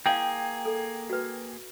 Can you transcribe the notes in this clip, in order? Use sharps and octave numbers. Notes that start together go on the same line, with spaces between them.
A#3 E4 G#4 F5 G5
A4
F#4 B4